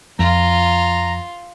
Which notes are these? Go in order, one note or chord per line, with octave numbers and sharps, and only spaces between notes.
F2 F4 A#5